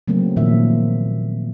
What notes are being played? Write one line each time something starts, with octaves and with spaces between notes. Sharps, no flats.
C#3 F#3 A3 A#3 C4
A#2 D#3 F3 A#3 E5